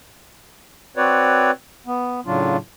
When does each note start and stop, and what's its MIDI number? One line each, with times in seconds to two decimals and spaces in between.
0.97 1.51 60
0.97 1.51 66
0.97 1.51 71
0.97 1.51 73
0.97 1.51 74
1.86 2.20 59
2.26 2.57 45
2.26 2.57 49
2.26 2.57 54
2.26 2.57 62
2.26 2.57 65